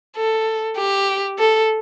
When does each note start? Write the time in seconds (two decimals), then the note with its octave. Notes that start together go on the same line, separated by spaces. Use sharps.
0.16 A4
0.77 G4
1.39 A4